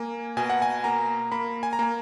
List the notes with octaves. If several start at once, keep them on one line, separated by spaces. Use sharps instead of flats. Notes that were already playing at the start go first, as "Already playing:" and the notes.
Already playing: A#3 G#5
B2 G#5
F#5
G#5
A#3 A#5
A#3 B5
G#5
A#5
A#3 G#5